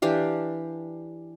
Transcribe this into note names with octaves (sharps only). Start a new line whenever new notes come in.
E3 D4 G4 F5